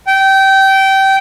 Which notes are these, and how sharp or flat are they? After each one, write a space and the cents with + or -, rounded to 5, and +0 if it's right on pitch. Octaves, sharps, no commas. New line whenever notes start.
G5 -20